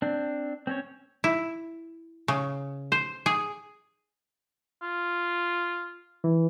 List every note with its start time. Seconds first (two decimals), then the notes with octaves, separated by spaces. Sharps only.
0.02 C4 D4
0.67 C4 C#4 C#5
1.24 E4
2.28 C#3
2.92 C5
3.26 G#4
4.82 F4
6.24 E3